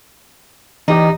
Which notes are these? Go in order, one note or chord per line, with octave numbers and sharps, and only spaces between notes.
E3 D#4 G4 D#5